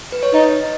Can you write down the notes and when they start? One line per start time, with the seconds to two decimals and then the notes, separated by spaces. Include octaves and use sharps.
0.12 B4
0.23 C#5
0.34 D#4 D#5